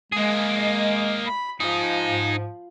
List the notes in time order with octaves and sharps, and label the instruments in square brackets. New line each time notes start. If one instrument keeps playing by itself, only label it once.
[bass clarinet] G#3 [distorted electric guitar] A#3 G#4
[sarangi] D#5
B5
[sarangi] F3 [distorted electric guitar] D#4 G#4
[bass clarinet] G#2